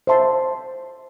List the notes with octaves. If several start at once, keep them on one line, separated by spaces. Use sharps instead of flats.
C5 E5 A5 C6